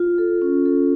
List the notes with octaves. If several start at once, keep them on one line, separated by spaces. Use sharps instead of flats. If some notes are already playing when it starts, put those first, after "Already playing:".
Already playing: F4
A4
C#4
A4